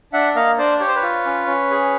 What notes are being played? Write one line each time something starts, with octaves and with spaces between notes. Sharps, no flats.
D4 E5 F#5
A#3 D#5 F5
D4 C5 D5
G4 C#5
C5
B4 C#5
F4
C#4
C#4
G#4